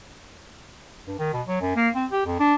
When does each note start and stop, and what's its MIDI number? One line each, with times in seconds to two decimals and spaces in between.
1.07 1.19 43
1.19 1.33 51
1.34 1.42 47
1.47 1.61 54
1.61 1.73 42
1.76 1.89 58
1.96 2.06 60
2.12 2.22 67
2.26 2.38 41
2.40 2.55 62